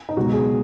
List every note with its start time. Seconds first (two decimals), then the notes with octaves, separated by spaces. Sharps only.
0.09 D#4
0.17 C#2 B2 F#3 F#4
0.33 G#4